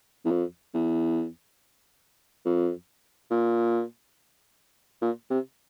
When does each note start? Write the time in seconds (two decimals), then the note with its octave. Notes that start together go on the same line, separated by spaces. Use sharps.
0.25 E2
0.31 F2
0.74 E2
2.45 F2
3.31 A#2
5.02 A#2
5.30 C3